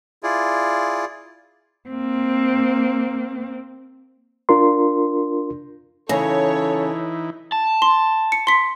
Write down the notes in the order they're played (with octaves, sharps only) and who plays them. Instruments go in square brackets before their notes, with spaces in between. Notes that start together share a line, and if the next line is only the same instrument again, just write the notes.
[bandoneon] E4 F4 G#4 D5
[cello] A#3 C4
[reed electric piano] D4 F4 A#4 C6
[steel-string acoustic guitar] C#3 [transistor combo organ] E3 D#4 E4 [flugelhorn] A4 [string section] C#5
[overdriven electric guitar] A5
[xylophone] C6
C#7
C6 B6